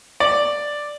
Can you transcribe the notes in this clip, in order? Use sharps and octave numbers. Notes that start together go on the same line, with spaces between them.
D5